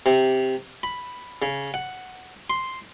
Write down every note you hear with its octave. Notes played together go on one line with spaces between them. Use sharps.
C3
B5
C#3
F#5
C6